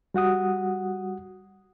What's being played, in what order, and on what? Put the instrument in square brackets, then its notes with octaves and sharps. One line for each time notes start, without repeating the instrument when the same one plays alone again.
[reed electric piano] G3 F#4 F#5 D#6